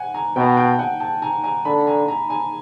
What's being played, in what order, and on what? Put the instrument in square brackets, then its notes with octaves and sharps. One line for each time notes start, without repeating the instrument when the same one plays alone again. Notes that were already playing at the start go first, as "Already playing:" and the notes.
Already playing: [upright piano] F#5 G#5
G#5 A#5
[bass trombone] B2 [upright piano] G5 A5
[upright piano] G5 A5
F#5 G#5
G5 A5
G#5 A#5
G#5 A#5
[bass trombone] D3 [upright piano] A5 B5
[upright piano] G#5 A#5
G#5 A#5
G#5 A#5